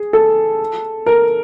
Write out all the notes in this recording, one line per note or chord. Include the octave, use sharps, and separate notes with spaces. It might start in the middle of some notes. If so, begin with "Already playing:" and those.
Already playing: G#4
A4
A#4